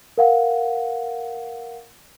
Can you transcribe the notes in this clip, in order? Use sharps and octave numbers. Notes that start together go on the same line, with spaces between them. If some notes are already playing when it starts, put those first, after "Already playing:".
A#4 F5 F#5